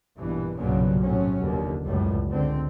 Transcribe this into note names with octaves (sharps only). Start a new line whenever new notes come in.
A#1 G2 B2 E3
B1 G2 A#2 C#3 F#3
A2 C3 F#3 C#4
F1 D#2 D3
C#2 F#2 A2 G3
C#2 D3 C4